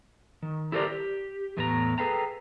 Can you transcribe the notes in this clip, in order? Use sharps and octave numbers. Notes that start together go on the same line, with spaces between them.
D#3
E4 G4 A4 A#4 C5 D5
G4
E2 A2 A3 B3 D4 A#5
G#4 A4 B4 F5 G5 A#5